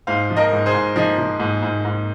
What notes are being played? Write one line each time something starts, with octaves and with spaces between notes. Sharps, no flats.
G#2 C5 F5
F3
A#4 D#5
G#2
G#4 C5
G#2
F3 D#4 G#4
F3
G#2
G#2
G#2